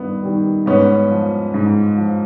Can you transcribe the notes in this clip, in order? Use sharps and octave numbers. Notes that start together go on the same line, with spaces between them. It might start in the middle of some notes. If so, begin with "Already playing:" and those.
Already playing: G2 D#3 B3
D#3 G3
G#2 B3 C#4
F3
G#2
F3